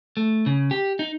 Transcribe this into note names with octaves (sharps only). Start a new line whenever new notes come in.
A3
C#3
G4
D#4